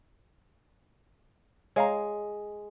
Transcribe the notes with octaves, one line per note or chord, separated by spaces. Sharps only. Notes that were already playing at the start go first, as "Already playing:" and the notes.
G#3 C#5 F5 A#5